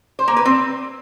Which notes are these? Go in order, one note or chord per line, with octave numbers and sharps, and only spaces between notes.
C5
A#3
B4
C4